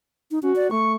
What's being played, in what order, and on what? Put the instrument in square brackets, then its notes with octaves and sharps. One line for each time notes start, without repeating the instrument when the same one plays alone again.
[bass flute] D#4
[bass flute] C#4 [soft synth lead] F#4
[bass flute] D5
[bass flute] A3 [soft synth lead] C#6